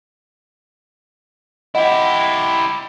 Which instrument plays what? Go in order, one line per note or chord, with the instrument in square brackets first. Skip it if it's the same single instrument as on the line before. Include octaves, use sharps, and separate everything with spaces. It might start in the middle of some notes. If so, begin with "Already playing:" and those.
[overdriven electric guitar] E4 G4 [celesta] D#5 F#5